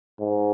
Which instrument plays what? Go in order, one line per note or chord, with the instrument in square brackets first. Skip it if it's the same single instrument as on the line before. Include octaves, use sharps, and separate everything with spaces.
[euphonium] G#2